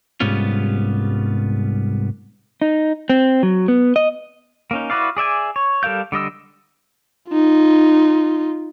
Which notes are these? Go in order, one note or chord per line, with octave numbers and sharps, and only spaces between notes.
C2 G#2 G3 B3 C#4 F4
D#4
C4
F#3
B3
D#5
A#3 C#4 D#4
E4 F#4 B4 D5 F5
G#4 D5 E5 G#5
C#5
G3 A4 A#4 F5 G6
D3 G3 D#5 E6
D#4 F4